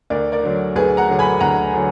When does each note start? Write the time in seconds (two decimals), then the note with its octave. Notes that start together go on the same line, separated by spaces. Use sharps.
0.10 D2 A#4 D5
0.32 A#4 D5
0.43 D3 F#3
0.76 D2 G#4 B4
0.97 F#5 A#5
1.08 D3 F#3
1.19 G#5 B5
1.41 D2 F#5 A#5
1.74 D3 F#3